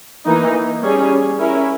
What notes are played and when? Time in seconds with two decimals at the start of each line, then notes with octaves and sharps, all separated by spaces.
0.26 E3 A#3 D#4
0.83 G3 C#4 G#4
1.38 C#4 E4 A#4